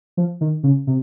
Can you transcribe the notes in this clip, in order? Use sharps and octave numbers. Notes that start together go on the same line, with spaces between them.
F3
D#3
C#3
C3